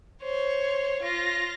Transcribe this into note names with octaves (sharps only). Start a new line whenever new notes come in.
C5 C#5
F4 A#6